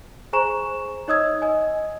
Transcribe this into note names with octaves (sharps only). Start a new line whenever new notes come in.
G#4 C5 G#5 A#5 C#6 E7
D#4 C#5 D#5 D#6 E6 G#6
D#5 G#5